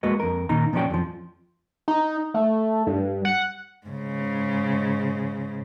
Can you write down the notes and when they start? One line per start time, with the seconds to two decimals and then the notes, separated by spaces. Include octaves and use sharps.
0.03 G#3 A#3 F#4 B4 D#5
0.20 F2 A#4
0.49 A#2 D#3 D#4 A#5
0.73 A#2 F3 F#3 C#4 D5 G5
0.90 F2 F3
1.88 D#4
2.34 A3
2.87 G2
3.25 F#5
3.87 G#2 C#3